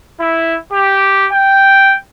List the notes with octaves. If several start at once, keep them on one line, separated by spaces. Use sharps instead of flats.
E4
G4
G5